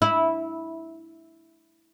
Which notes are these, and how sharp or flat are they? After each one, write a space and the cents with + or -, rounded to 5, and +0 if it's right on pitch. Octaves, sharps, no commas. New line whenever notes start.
E4 -10